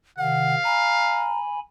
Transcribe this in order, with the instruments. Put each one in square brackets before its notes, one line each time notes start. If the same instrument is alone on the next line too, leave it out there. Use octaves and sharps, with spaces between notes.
[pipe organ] C3 D#3 [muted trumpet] F5 [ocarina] F#5
[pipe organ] G#5 B5 [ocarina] A#5